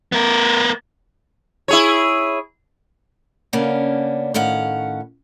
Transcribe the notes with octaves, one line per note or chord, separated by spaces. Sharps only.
B3 A#4
E4 G#4 C#5
C#3 A#3 B3 C#4 D4
A2 D#3 C#4 F5 F#5